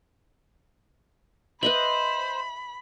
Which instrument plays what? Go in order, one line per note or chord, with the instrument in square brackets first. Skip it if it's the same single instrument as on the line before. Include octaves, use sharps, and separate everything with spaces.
[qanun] B4 D#5 E5 [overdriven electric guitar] C5 [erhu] B5 [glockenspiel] F#7